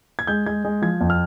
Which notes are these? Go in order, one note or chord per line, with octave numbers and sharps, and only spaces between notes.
G#6
G#3 G6
G#3 G#6
G#3
F3 G#6
F2
F6